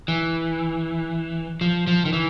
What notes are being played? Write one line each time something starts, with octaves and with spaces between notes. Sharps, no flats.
E3
F3
F3
D#3
E3